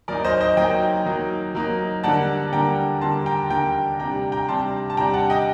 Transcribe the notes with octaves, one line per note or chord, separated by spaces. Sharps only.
F#3 A#3 D#4 A#4 D5
C5 D#5
C5 D#5
F#3 A#3 D#4 D#5 G5
F#3 A#3 D#4
F#3 A#3 D#4
D3 G3 A#3 D4 F#5 A5
D3 G3 A#3 D4 G5 A#5
D3 G3 A#3 D4 A5 C6
G5 A#5
D3 G3 A#3 D4 G5 A#5
C3 G3 D4 G5 A#5
G5 A#5
C3 G3 D4 A5 C6
A5
C3 G3 D4 G5 A#5
F#5 A5
D#5 G5